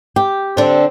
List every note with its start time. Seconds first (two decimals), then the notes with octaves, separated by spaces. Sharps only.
0.16 G4
0.57 D3 C4 D4